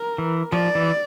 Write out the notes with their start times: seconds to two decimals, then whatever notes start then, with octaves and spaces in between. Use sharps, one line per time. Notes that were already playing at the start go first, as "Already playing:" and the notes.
Already playing: A#4
0.18 E3
0.52 F3 D5
0.75 E3